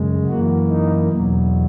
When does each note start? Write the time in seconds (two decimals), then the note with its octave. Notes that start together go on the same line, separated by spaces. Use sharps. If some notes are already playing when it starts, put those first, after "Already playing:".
Already playing: F#2 C#3 G#3
0.27 F#2 E3 A#3 F#4
0.68 D#4
1.09 E2 B2 F#3